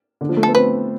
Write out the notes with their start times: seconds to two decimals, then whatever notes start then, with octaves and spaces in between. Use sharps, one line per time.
0.21 D3
0.29 F3
0.37 A3
0.43 B3 A4
0.55 C4 B4